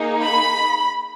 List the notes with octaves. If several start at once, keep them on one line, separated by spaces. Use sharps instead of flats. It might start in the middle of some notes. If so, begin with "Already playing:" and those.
Already playing: A#3 D#4 G#4
B5